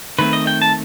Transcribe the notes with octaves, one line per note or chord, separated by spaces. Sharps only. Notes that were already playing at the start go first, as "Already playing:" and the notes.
D#3 A3 C4 B4
D#5
G5
A5